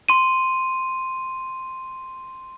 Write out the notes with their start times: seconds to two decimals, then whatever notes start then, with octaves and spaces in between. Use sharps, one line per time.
0.09 C6 D#7